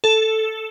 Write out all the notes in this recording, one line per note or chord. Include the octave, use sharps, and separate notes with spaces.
A4